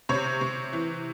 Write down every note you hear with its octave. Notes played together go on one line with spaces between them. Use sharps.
C3 C#5
C3
E3